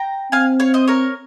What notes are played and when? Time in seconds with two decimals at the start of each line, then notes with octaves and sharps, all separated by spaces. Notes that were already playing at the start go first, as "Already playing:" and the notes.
Already playing: G5 A#5
0.32 C4 F5 G#5
0.60 C#5 F5
0.74 C5 D#5
0.88 A#4 C#5